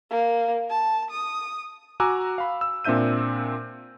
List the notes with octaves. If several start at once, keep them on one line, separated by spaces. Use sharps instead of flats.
A#3
A5
D#6
F#4 G#5 A#5 D6 E6 F#6
F5 B5
E6
A#2 C4 D4 E5 G6 D#7